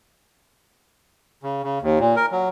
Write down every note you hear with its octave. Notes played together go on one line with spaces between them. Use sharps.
C#3
C#3
D#2
A#2
A#4
F#3